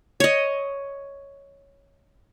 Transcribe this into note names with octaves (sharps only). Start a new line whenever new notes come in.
C#5 D#5